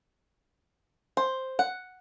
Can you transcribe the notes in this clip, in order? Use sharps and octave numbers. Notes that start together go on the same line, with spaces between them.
C5
F#5